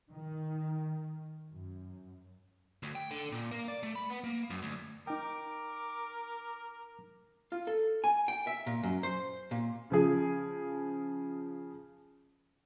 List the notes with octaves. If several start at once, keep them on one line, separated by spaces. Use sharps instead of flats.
D#3
F#2
D2
G5
D3
A#2
A#3
D5
A3
B5
B3
A#3
F#2
D2
D#4 A#4 G5 D6
F4
A4
G#5
G5
E5
A#2
F#2
C5
A#2
C#3 F3 G#4